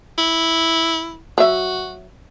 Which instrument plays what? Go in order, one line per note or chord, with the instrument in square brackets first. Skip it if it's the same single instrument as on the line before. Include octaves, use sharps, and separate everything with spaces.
[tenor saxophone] E4
[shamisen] F#3 E5 [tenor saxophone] F#4